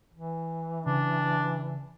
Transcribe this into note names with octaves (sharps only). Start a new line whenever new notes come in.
E3
C#3 D4